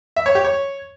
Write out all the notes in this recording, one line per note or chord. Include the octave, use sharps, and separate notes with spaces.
E5
C#5
G4
C#5